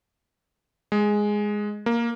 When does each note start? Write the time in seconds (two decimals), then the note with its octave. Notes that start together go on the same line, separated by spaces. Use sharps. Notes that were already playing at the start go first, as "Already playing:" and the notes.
0.92 G#3
1.86 A#3